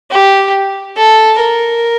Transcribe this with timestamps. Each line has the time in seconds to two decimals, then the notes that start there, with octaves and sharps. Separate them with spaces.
0.12 G4
0.97 A4
1.41 A#4